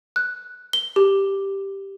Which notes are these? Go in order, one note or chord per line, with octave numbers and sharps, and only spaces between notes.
F#6
G7
G4